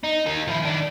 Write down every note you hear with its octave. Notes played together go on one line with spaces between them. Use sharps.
D#4
A#3 D#4
F3 E4
D#3 D4